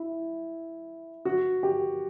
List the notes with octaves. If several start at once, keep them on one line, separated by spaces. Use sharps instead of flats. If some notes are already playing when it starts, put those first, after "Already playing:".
Already playing: E4
F#4
G4